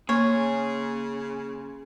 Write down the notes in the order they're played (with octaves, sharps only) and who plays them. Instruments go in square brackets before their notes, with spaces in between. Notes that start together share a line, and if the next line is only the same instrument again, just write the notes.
[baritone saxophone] C#3 [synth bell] A#3 C6 [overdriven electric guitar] G#4 [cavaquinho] C#5